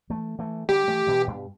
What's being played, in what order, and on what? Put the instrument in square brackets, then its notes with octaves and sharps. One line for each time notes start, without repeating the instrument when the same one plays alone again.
[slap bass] E3 A3
E3 A3
[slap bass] D3 G3 [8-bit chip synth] G4
[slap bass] E3 A3
B2 E3
G2 B2